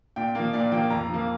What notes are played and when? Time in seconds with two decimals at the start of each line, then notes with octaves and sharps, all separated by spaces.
0.16 A#2 G5
0.35 F3 A#3
0.53 A#2 D5
0.72 F3 A#3 G5
0.90 F2 A#5
1.09 F3 A#3